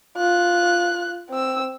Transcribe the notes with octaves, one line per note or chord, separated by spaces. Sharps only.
F4 F#6
C4 E6